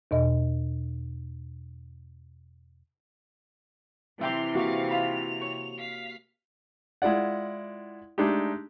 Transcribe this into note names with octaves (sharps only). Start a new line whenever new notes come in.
E2 B2 D#5
C3 E3 E5 G5 C6 D6 F6
A#3 F#4 G4 F5 C#6
F4 B5 F7
C#5
F5 B6
G#3 E4 F4 D5 F#5
G#3 A3 D4 D#4 G4